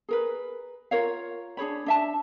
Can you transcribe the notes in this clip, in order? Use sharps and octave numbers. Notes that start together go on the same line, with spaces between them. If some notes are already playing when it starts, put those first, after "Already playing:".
G#4 A#4 B4
F4 A#4 C#5 F5
D4 G#4 C#5 B5
D4 E5 A5